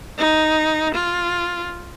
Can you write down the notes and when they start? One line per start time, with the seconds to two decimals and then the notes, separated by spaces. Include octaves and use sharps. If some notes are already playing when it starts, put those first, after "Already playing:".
0.18 D#4
0.94 F4